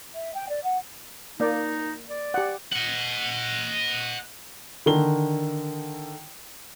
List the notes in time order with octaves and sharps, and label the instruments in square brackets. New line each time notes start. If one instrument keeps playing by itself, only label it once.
[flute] E5
G5
D5
F#5
[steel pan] A#3 D5 [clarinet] D#4
[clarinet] D5
[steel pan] G4 F#5
[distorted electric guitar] D#5 F#5
[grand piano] D3 D#3 G7